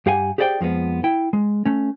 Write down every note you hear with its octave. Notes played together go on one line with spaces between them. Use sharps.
G2 G4 F5 F#5 G#5
G4 G#4 C5 D5 F#5 G5
F2 F3 G#3 B3
E4 G5
G#3
A3 C#4